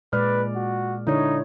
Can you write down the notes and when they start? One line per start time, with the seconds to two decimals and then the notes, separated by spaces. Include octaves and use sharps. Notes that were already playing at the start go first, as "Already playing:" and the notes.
0.13 A#2 G#3 B4 D5 F6
0.55 F#4
1.07 D3 D#4 E4 C#5